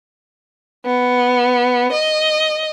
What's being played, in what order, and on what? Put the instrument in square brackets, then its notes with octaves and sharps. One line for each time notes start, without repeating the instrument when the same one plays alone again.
[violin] B3
D#5